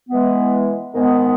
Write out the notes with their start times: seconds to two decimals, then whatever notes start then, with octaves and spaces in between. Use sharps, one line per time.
0.09 E3 G#3 B3
0.93 G#2 D#3 G#3 B3